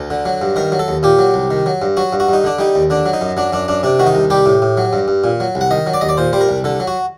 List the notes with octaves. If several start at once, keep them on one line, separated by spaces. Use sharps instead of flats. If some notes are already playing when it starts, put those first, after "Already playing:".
Already playing: D2 A4
D3
F#3
G2
D#3 A#4
F#3
A4
D#2
A#2 G4
F#3
C2
D#3
F#3
G2
F#3 F#4
G2
F#4
G2 D#4
D3 D4
G3 D#4
D#2
D3 D4
F#3
D#4
F#2
F#3 D4
F#2 D4
F#2 D4
C3 D4
D#3 F#4
D#4
C2
G3 G4
A2
A2
F#3
G2
G2
A#2
F#3
C2
F#5
D#3 D#5
F#3
D5
D#2 D#5
D5
A#2 C5
G3 C5
A#4
C2
D3 A4
F#3
F#4